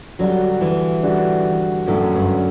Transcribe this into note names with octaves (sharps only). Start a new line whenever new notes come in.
D3 F#3 G3 D4 F#4
E3
D3 G3 D4 F#4
F#2 A2 D3 F#3 A3 C#4
G2